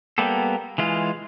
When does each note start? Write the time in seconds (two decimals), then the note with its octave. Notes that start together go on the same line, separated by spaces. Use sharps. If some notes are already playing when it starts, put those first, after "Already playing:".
0.18 G3 A#3 B3 G4 A4
0.78 E3 G#3 F4